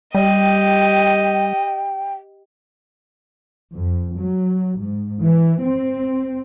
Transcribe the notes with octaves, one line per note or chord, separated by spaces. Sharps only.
G3 G4 D#5 G5
F2
F#3
G#2
E3
C4